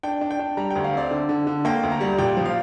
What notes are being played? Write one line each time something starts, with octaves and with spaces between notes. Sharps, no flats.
D4 G5
D4
G5
D4
G3 A#5
D2 G5
F5
C4 D5
D3
D3
D3
A#3 G5
D2
A#5
G3
A#2 G5
F3
F5